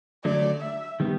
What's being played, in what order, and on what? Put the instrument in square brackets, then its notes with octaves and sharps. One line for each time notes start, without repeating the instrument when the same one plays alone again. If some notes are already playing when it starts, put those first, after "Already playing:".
[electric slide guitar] D3 F#3 A3 [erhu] D5
[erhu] E5
[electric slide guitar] D#3 G3 B3